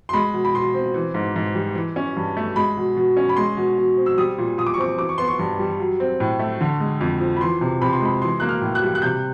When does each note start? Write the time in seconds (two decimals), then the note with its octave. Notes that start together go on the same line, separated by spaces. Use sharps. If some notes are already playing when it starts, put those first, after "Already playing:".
0.09 C6
0.13 G#3 B5
0.34 B2
0.45 B5
0.54 B2 C6
0.74 C4
0.94 E3
1.14 G#2
1.36 G#2
1.55 G3
1.75 E3
1.96 C#4
2.16 G2
2.37 A3
2.56 G#3 B5
2.77 B2
2.97 B2
3.17 C#4
3.29 B5
3.36 G#3 C6
3.57 B2
3.78 B2
3.97 C4
4.06 E6
4.18 G3 D#6
4.38 A#2
4.58 A#2 D#6
4.66 D6
4.74 C#6
4.79 C4 D6
4.98 E3 D6
5.09 C#6
5.18 B3 C6
5.28 C#6
5.39 G2
5.59 G3
5.80 F#3
6.00 C4
6.20 A2
6.39 A3
6.61 D3
6.80 G#3
7.01 F2
7.21 F3
7.37 B5
7.41 E3 C6
7.61 C3
7.82 C3 B5
7.93 C6
8.01 G#3 B5
8.22 E3 C6
8.40 A#3 F#6
8.49 F6
8.62 A2
8.75 F#6
8.82 G3
8.95 F#6
9.02 C3 G6